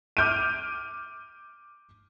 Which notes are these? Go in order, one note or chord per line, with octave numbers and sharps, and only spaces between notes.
D6 F6 G6 D7 D#7